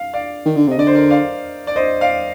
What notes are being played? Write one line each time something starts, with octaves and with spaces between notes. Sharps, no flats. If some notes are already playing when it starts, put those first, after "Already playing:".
Already playing: F5
D5 F5
D#3
D3
C3 D#5
D3 D5
C5
A#4 D5
D5 F5
D5
C5 D#5
D5 F5